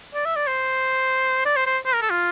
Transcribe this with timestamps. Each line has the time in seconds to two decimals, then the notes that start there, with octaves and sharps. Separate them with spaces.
0.15 D5
0.25 E5
0.36 D5
0.47 C5
1.45 D5
1.56 C5
1.67 C5
1.86 C5
1.94 A#4
2.02 A4
2.10 F4